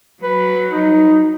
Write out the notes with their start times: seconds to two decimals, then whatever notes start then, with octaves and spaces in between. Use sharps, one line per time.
0.23 F#3 B4
0.71 D#4